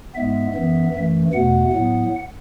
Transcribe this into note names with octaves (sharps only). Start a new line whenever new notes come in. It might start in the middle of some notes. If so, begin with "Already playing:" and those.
G#2 G#3 B3 E5
F#2 E3 B3
F#2 E3 A3
E2 B2 A3 F#5
A2 F#3 B3